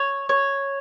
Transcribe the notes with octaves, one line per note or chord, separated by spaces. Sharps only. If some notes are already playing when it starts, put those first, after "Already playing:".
Already playing: C#5
C#5